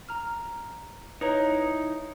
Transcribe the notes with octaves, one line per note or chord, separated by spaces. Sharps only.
A#5 F6
D#4 E4 B4 C#5 A#5